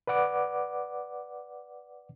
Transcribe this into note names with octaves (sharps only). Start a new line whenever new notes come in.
B4 D5 F#5 D6